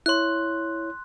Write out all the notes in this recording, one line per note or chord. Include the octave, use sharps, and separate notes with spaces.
E4 C#5 C6 F#6